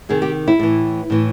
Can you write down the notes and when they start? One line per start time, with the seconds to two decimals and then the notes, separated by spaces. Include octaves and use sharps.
0.09 C3 D#3 G#4
0.22 G4
0.48 E4
0.59 A2 E3
1.10 A2 E3